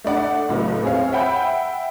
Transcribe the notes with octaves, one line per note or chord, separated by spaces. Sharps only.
A3 D4 D5 F#5
C#2 A2 F#3 B3
C4 G#4 C#5 F5
E5 F#5 G5 B5 G6